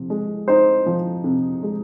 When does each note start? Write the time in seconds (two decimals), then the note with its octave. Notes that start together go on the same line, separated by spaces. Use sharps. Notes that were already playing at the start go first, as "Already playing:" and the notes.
Already playing: C3 F3
0.10 G#3
0.48 D#4 C5
0.86 F3
1.24 C3
1.63 G#3